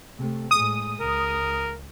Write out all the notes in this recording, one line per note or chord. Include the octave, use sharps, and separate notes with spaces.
C3 A3
A2 G#3 D#6
C#2 A#4